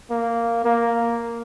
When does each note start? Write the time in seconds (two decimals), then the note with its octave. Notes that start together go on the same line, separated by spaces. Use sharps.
0.10 A#3
0.64 A#3